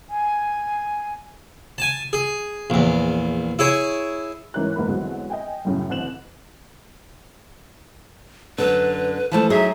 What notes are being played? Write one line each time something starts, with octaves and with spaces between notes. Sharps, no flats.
G#5
G#5 A5
G#4
A#1 E2
E4 G#4 C#5
G#2 E3 C#4 A#4 C#5 F#6
G1 E2 G#2 A#3 B5
E2 D3 F#3 G#3 C4
D#5 G5 G#5
F#2 A2 C#3
A1 D3 C4 F#6 E7 F#7
F#2 D3 B4
E3 F3 A3 A5
F#3 D#4 G#4 E5